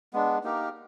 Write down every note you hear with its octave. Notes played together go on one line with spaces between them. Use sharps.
G#3 B3 D4
A#3 D#4 G4 A#4